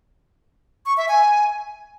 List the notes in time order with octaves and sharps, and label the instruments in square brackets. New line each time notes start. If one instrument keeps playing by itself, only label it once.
[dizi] C#6
E5
G#5